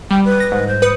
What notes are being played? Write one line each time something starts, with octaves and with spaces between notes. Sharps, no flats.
G3 G5
B4
A#6
G#2
C5
B4 D#6 C#7